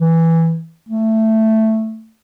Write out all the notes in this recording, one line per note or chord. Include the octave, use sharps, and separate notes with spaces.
E3
A3